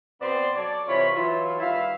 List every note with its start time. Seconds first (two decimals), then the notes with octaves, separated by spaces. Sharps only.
0.20 B2 B3 C4 D5 C6
0.55 F#3 A4 C#5 D5
0.87 C3 E3 F4 C#5 B5
1.15 E3 F#3 E4 F4
1.60 G2 D#3 E4 E5 F5